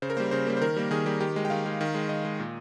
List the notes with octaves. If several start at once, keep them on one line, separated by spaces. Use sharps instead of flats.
C#3 C5
A#4
G3 A#3 C5
C#3 C5
G3 A#3
C5
D#3 A#4
G3 A#3
D#3 G#4
G3 A#3
D#3 G4
G#3
G5
D#3 F5
G#3
D#3
G#3
D#3 D#5
G#3
A#2